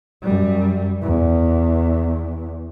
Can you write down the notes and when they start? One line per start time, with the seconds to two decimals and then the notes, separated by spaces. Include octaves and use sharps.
0.23 F#2 G3
1.02 E2